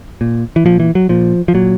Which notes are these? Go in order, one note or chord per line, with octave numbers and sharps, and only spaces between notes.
A#2
E3
A#2 F3
E3
F#3
A#2 F3
F3
A#2 F#3